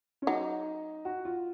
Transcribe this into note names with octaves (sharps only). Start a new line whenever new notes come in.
C#4
F#3 D#4
F#4
F4